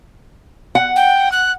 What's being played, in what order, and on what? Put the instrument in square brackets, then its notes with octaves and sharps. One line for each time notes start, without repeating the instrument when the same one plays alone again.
[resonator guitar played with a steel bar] F#5
[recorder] G5
F#6